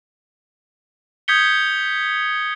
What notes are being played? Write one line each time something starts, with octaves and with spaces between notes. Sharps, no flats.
D#6 G6 G#6 B6 C#7 G7